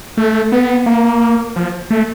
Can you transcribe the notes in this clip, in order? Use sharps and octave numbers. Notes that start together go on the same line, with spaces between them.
A3
B3
A#3
F3
A3